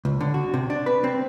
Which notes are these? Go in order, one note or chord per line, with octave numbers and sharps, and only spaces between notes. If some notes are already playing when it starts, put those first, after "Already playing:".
C#2
D3
F#4
C3
D4
B4
C4